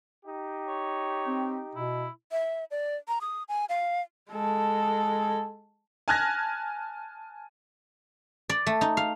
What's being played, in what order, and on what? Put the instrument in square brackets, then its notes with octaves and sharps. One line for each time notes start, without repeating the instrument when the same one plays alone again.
[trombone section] D#4 G4
[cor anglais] C#5
[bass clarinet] C4
[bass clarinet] B2 [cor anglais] E4
[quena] E5
D5
A#5
D#6
G#5
F5
[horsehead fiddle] G#3 A4
[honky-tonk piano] G#5 A5 F6 F#6 G#6 A#6
[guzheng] D5
A3
D#4
F5